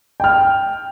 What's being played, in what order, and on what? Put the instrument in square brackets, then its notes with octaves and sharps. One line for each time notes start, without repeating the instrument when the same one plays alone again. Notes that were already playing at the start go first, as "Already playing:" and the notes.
[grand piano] G5 F6